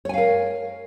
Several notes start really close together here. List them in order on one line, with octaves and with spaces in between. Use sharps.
C#5 G#5 F5 A#4